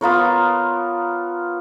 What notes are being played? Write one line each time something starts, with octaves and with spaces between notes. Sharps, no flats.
B3 F4 A#4 C#5